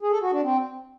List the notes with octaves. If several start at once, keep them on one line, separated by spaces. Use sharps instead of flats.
G#4
A4
F#4
D4
C4